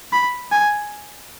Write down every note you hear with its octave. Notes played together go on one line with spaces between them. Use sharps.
B5
G#5